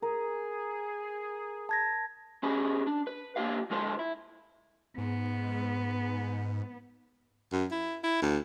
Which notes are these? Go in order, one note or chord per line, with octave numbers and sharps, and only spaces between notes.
G#4 A#4
A5 G#6 A#6
C#4 G4 G#4 B4 B5
D4
B4
A#3 D4 F4 G4 F5
D3 G#3 F4 A4 B4 C5
E4
G#2 B3
F#2
E4
E4
D2